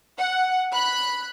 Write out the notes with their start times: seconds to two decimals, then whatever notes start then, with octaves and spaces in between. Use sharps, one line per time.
0.19 F#5
0.74 B5 F#6